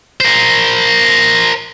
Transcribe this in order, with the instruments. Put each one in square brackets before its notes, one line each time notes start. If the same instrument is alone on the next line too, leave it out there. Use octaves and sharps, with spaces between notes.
[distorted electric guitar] A#4 C5